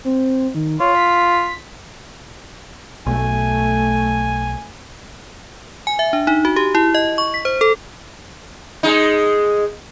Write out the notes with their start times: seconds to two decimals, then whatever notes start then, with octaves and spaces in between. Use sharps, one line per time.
0.05 C4
0.55 D#3
0.80 F4 C#5
0.95 B6
3.06 B1 A3 G#5
5.87 G#5
5.99 E5
6.13 D4
6.27 D#4
6.45 F#4
6.56 G4
6.75 E4
6.95 D#5
7.18 C#6
7.34 B6
7.45 C5
7.61 A4
8.83 G#3 D#4